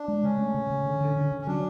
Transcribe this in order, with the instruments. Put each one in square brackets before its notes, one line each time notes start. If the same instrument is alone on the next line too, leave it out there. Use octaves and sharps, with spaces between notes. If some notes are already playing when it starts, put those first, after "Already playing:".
Already playing: [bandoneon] D4
[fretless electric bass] G#3
[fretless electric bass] C#3 [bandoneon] C#4
[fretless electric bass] A3
C#3
C#3
D3
D3
D3
D3
[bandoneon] C#4
[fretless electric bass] F#3 [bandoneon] D4